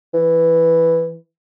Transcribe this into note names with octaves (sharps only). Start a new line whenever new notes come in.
E3